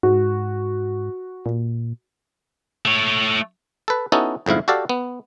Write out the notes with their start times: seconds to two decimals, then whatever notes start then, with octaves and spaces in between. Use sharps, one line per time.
0.03 G#2 F#4
1.46 A#2
2.86 A3 C#5
3.88 A4 B4
4.12 B3 C#4 D#4 E4 F#4 A4
4.46 G1 F2 G#2 E4 F5
4.68 F#4 G4 A4 D5 F5
4.89 B3